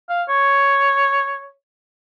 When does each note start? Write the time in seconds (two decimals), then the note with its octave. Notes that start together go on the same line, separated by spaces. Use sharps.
0.09 F5
0.29 C#5